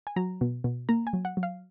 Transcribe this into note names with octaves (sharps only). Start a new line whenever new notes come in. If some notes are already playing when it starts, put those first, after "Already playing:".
G#5
F#3 A#5
B2
B2
A#3 A#5
G#5
F#3
F#5
F#3
F5